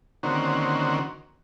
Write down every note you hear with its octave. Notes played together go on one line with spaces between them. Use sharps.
D3 D#3 A#3 C4 C#4 F#4